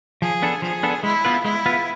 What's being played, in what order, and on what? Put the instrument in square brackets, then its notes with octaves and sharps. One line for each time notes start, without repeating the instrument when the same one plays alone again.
[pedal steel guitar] F3 [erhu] G#4
[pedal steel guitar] B3 D4 A4
[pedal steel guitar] F3 [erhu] G#4
[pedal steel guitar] B3 D4 A4
[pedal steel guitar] G#3 [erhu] E4
[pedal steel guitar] B3 F4 B4
[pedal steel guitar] G#3 [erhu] E4
[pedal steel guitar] B3 F4 B4